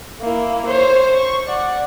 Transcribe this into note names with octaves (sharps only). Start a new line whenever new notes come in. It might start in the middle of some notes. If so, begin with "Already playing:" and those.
A#3 E4
C5 C#5
C#6
D5 F#5